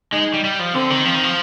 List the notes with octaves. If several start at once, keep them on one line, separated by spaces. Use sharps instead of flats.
G#3 D#4
G3
G3
F3
D3 C4
D#3
F3 C4
D#3
F3